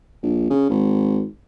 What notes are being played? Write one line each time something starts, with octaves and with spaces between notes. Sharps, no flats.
A#1
C#3
G#1